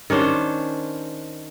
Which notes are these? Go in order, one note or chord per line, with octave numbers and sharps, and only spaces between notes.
D#3 C#4 D4 C5